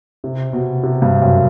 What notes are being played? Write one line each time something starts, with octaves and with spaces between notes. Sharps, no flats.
C3
B2
C3
G2
F#2